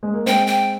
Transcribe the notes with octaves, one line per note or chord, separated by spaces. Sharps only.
G#3
A#3
G#3 C4 G5
G5